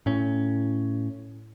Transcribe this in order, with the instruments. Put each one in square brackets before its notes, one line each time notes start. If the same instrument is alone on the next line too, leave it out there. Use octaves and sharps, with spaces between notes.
[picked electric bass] A2 C#4